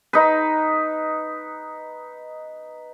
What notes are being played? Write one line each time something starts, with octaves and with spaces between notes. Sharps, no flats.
D#4 B4